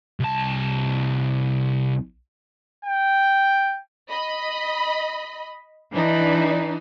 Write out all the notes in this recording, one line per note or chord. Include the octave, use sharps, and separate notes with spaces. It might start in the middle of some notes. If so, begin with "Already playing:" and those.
C2 A5
G5
D#5 B5
E3 D4 D#4